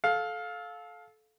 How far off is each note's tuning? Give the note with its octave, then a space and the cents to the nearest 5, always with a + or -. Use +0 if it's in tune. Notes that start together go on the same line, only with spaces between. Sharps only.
A4 -20 F5 +15